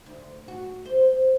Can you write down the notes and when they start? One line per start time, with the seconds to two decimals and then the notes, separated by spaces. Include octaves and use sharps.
0.06 D2
0.48 F#4
0.85 C5